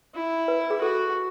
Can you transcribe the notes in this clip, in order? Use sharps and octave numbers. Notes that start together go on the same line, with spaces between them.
E4
B4
G#4
F#4 A4